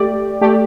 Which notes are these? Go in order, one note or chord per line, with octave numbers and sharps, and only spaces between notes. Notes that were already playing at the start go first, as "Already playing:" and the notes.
Already playing: A3 G4 D5
A3 G4 D5